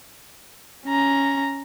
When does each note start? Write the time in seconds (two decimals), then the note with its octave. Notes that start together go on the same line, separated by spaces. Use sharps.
0.86 C#4 A#5